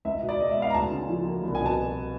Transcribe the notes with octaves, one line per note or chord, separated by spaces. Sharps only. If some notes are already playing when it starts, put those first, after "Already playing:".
C#2 E5
B2
D5
G#3 D#5
E5
B3
F5
A#5
D2 A5
C#3
F3
A#3
C2
G#5
B2
A5